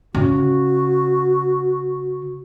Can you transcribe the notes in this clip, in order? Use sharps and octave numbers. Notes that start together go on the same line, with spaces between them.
C#3 F#4